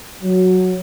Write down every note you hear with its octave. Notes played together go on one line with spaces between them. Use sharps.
F#3